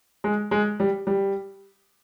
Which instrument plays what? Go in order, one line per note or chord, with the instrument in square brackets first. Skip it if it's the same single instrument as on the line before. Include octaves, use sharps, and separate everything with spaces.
[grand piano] G#3
G#3
G3
G3